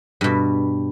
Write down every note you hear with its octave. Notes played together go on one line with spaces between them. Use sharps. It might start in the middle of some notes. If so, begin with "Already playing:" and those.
G2 B2